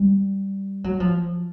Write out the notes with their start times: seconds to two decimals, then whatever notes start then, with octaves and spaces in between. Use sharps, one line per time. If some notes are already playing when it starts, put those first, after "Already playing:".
Already playing: G3
0.84 F#3
1.00 F3